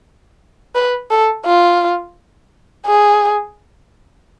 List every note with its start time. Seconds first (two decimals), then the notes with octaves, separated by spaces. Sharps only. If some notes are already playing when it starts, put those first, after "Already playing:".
0.75 B4
1.11 A4
1.46 F4
2.87 G#4